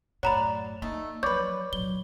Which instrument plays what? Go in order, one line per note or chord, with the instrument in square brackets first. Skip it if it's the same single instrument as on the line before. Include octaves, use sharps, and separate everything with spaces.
[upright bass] F#2 A2 [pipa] F#4 D5 [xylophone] C#5 A#5 B5
[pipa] A3 D#4 [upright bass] A#3
[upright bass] F3 F#3 [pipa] F4 B4 [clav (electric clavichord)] C#5 D5 [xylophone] G6
[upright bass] A#2 F#3 [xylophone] G7